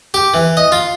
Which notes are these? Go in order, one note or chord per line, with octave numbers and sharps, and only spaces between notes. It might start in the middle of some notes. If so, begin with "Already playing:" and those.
G4
E3
D#5
F4